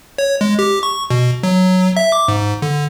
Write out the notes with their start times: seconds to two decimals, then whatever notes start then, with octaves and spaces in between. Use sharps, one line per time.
0.18 C#5
0.41 G#3
0.59 G4
0.83 C#6
1.10 B2
1.43 F#3
1.97 E5
2.12 D6
2.28 G#2
2.62 D3